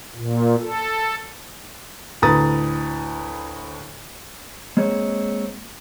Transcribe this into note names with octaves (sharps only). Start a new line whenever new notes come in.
A#2
A4
D2 A2 B4 A#5 D#6 A6
G#3 A#3 C4 G#4 C#5